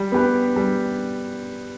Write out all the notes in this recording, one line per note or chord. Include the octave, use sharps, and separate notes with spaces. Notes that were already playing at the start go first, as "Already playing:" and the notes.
Already playing: G3
B3 G4 B4
G3